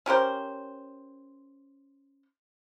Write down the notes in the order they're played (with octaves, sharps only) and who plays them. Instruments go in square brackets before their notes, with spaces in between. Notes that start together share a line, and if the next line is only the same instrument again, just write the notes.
[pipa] C#4 G4 A#4 C5